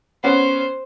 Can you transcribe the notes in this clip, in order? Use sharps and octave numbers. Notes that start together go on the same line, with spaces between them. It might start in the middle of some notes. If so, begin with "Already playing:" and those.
B3 C#4 C5